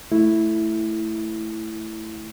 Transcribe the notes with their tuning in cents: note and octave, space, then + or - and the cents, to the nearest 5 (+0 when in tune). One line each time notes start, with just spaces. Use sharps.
A3 +0 E4 +0